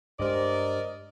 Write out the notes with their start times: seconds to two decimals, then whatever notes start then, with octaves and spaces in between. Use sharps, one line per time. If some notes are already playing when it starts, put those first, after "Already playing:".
0.20 G2 G#3 D4 G4 A#4 C5 D5 D#5